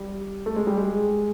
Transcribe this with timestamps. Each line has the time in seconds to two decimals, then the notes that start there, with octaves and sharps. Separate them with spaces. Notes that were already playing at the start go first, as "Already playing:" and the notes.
Already playing: G3
0.46 A3
0.56 G#3
0.67 G3
0.77 G#3